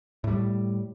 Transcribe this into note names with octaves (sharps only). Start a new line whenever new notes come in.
A2 G3